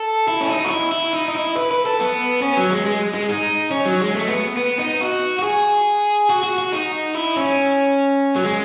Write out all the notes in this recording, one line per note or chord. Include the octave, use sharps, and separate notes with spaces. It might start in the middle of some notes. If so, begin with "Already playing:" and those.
Already playing: A4
E4
C#4
D#4
F#4
E4
E4
D#4
D#4
E4
B4
B4
A4
B3
C#4
F#3
G#3
G#3
G#3
D#4
C#4
F#3
G#3
A3
B3
B3
D#4
F#4
F#4
G#4
F#4
F#4
F#4
D#4
E4
C#4
F#3
G#3